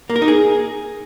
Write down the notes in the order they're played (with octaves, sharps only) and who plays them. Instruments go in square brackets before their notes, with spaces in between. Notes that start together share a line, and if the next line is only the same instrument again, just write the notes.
[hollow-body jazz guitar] A#3
A#4
D#4
G#4